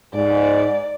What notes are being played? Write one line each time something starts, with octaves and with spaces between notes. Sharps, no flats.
G#2 D5